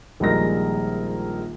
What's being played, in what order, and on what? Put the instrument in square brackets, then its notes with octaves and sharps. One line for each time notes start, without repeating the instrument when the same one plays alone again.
[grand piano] A#1 D#3 G3 G#3 A#4 A#6